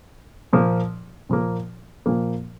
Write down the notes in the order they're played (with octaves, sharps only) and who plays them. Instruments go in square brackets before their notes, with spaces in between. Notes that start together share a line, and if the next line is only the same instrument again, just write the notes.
[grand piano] A#2 F3 A#3
A#2 F3 A#3
A#2 F3 A#3